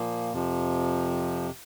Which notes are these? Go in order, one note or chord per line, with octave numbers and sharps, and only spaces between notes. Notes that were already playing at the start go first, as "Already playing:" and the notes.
Already playing: A#2 F3 A#3
F2 C3 F3